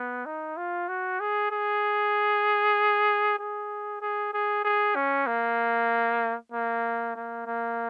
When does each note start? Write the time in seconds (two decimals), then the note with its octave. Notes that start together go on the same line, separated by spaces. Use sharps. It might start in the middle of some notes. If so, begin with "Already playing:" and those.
Already playing: B3
0.26 D#4
0.57 F4
0.89 F#4
1.20 G#4
1.51 G#4
3.39 G#4
4.01 G#4
4.33 G#4
4.65 G#4
4.96 C#4
5.27 A#3
6.52 A#3
7.16 A#3
7.46 A#3